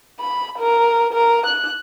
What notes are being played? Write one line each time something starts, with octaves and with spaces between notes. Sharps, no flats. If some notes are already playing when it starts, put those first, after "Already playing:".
B5
A#4
A#4
F#6